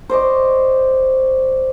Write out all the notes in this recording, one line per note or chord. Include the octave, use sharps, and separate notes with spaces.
C5 D5 D#5 C#6